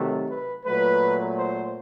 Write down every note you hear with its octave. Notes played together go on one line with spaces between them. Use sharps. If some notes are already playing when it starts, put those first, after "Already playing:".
Already playing: C3 D#3 F#3 A3
B4
A#2 F#3 A3 B4
C5